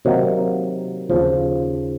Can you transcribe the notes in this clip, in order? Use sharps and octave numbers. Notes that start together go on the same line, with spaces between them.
C3 D#3 F#3 A#3
D#2 C#3 F3